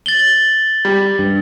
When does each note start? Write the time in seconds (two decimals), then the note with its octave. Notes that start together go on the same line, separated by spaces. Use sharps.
0.06 A6 F#7 G7
0.85 G3
1.19 G2